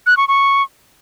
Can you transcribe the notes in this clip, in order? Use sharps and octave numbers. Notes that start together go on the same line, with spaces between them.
F#6
C#6
C#6